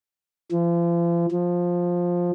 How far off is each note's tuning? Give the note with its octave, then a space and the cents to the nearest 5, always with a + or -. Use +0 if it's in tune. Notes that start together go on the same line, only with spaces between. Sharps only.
F3 -40
F3 +10